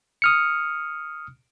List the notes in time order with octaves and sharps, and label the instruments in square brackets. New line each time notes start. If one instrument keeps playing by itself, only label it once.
[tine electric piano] D#6 F6 C#7